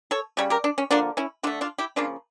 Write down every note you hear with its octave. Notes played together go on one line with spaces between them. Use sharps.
A4 C#5
C#3 G3 C#5
G4 A#4
D4
C#4
D3 F3 A#3 D4
C#4 E4
D3 A3 D4 F4
D4 F4
E4 G4
C#3 F3 A#3 D4 F4